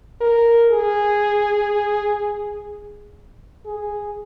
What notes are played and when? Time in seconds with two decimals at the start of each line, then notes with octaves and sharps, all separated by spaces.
0.21 A#4
0.70 G#4
3.66 G#4